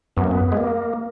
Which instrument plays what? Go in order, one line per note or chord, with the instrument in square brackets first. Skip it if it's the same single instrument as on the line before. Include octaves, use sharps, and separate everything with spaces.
[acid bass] F#2 [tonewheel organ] B3
[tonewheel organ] A#3
B3
G#3
A#3